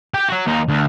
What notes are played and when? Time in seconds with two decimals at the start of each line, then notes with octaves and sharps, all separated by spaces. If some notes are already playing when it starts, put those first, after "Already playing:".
0.14 G4 G5
0.29 F#3 F#4
0.47 D#2 D#4
0.68 D2